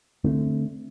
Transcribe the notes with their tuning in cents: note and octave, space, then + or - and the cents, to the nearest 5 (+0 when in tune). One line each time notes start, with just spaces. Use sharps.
D3 +0 A3 +0 C4 +0